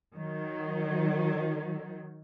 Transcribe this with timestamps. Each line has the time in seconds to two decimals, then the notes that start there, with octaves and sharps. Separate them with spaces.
0.15 D#3 F#3